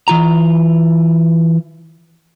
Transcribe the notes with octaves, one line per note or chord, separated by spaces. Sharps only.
E3 F4 A#5